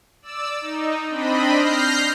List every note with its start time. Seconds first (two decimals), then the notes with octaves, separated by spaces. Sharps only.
0.22 D5 E6
0.61 D#4
1.08 C4 D4 D#5 B5
1.53 F6 G6 A#6 C7